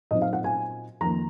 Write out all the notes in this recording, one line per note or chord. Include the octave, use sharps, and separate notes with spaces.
A#2 F#3 C4 D#4 D#5
F5
F#5
G#5
F2 D#3 A#3 A#5